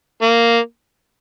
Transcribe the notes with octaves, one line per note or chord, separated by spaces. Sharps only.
A#3